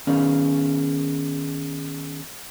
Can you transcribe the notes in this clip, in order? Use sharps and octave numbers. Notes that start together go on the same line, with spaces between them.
D#3 B3 C#4 G#4 D5 F5